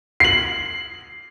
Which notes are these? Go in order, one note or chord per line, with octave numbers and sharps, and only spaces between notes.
C7 F#7